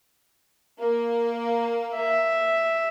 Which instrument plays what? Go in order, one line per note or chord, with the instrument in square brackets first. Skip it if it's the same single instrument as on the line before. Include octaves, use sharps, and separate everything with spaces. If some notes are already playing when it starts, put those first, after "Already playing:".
[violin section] A#3
[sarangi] E5